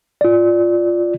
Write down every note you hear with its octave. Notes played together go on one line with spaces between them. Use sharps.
F4 D5